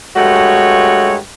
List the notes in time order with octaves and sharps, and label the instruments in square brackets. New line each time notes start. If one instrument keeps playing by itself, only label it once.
[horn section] G2 G#3 A3 F#4 C#5